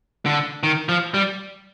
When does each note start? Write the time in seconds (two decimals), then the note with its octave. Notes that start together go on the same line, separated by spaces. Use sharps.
0.26 D3
0.63 D#3
0.89 F3
1.14 G3